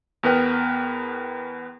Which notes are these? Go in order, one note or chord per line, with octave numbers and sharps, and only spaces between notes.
E2 B3 A#4 B4 G5 F6